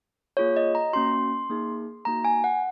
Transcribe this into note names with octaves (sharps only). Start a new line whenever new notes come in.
A#3 F4 G#4 C#5
D#5
A#5
A#3 C#4 F#4 C6
A#3 D#4 G#4
A#3 D#4 F#4 A#5
G#5
F#5